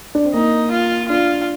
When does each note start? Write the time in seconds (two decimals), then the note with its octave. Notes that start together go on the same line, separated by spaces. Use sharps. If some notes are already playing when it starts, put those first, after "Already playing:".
0.15 D4
0.25 C4
0.34 A#3 D#4
0.71 F4
1.09 D4 F4